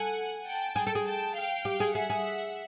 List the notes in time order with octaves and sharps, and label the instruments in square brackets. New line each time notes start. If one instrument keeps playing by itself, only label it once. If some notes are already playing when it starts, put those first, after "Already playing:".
Already playing: [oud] A4 [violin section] F#5 G#5
[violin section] G5 A5
[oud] G#4
A4
G#4
[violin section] G5 A5
F5 G5
[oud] G4
G#4
[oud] G#4 [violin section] E5 F#5
[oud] G#4